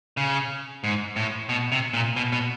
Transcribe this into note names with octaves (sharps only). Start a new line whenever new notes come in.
C#3
G#2
A2
B2
C3
A#2
B2
B2